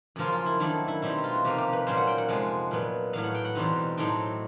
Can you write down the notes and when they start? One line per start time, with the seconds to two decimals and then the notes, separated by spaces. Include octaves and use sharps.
0.16 F#2 C#3 F3 A#3 F4
0.32 F4
0.46 E4
0.60 D#3 F#3 A3 D4 E4
0.88 E4
1.02 B2 G3 C4 D#4 E4
1.24 F4
1.34 F#4
1.44 C3 F3 A#3 D#4 G4
1.58 G4
1.73 B4
1.86 A#2 F#3 A#3 C#4 C5
1.97 F#5
2.07 G5
2.18 F#5
2.28 F2 C3 F3 G#3
2.71 A#2 F#3 B3
3.13 A2 F#3 B3 F5
3.24 F#5
3.35 G5
3.45 F#5
3.55 E2 B2 G3 C4 D#4
3.97 A2 F#3 A3 C4 D#4 G5